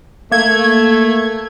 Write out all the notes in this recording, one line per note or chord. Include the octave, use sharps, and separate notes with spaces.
A3 A#3 G#6